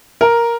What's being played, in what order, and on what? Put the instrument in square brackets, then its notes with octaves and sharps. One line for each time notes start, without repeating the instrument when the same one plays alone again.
[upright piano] A#4